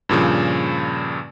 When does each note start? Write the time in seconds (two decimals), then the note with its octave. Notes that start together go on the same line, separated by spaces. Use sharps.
0.09 G2 A#2 C#3 F3